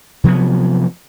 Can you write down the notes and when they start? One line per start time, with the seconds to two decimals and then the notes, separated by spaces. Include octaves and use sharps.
0.24 C3 F3 F#3 B3